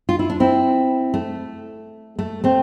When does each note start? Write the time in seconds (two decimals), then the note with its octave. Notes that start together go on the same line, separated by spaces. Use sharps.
0.09 F4
0.19 E4
0.30 D4
0.40 C4 E4
1.14 A3
2.19 A3
2.44 A3 C4